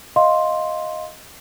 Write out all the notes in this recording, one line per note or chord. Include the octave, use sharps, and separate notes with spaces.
D#5 F5 C6